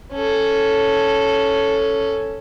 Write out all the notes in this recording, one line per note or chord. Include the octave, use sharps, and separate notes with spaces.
C#4 A4